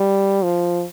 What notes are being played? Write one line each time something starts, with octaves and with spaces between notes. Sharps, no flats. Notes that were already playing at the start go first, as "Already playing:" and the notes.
Already playing: G3
F3